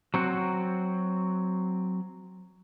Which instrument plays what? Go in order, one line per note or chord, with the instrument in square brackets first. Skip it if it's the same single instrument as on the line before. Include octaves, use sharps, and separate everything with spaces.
[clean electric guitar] F#3 C4 F#4